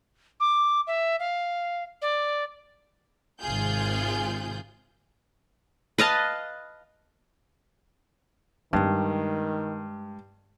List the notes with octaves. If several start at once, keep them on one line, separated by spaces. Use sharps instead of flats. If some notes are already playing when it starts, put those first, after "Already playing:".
D6
E5
F5
D5
G#1 C3 F4 G#4 G6
B4 D#5 F5 A5
G2 D#3 G3 G#3